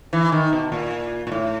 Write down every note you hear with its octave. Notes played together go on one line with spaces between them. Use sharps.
E3
D#3
B2
A#2
A#2
A2